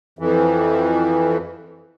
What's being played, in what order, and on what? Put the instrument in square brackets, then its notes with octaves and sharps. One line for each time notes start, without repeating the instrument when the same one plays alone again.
[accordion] F2 E3